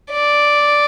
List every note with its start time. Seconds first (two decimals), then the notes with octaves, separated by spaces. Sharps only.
0.11 D5